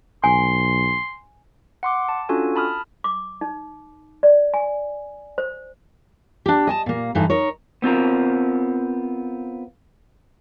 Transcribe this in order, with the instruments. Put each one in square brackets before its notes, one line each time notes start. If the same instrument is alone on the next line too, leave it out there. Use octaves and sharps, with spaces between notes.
[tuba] B1 [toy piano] G#5 [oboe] C6
[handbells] F#5 C6 D6
A5
C#4 D4 F4 F#4 A4 G#5
A5 B5 D#6 F6
[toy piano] D6
D#4
D5
G#5
C5
[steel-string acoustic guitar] D4 G4
D#5 G#5 A5
A#2 A#3
G2 E3 D#4 A4
D#4 A#4 C#5
[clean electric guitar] B3 C4 F4 A#4